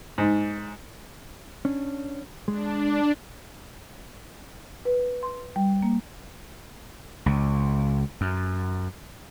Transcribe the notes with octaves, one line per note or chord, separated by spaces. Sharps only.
G#2
C#4 D4
G#3 D4
B4
C6
G3
A#3
C#2
F#2